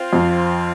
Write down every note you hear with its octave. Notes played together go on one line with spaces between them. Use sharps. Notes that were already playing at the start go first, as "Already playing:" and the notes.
Already playing: C4 F4 C5 F5
F2